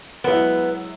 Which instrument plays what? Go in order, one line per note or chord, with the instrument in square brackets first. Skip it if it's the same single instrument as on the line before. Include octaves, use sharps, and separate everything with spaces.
[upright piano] F#3 G#3 E4 [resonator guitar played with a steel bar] B3